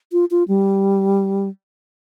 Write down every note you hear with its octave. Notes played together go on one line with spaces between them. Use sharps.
F4
F4
G3